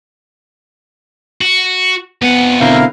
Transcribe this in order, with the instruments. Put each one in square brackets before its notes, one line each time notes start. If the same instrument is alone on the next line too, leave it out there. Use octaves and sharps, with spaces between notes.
[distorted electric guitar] F#4
[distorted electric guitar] F2 F#5 [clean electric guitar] B3
[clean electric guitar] B2 D3 C4 [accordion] E4 A#4 F5